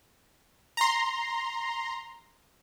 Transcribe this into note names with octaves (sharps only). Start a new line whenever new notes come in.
A#5 C6